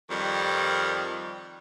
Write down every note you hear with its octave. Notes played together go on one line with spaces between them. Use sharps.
F2 D#3 G3